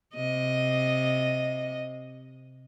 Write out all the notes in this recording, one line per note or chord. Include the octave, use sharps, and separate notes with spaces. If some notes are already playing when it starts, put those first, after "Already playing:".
C3 D#5